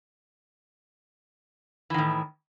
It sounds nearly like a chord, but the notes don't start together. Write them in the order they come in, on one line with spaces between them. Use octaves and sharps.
E3 D#3 A2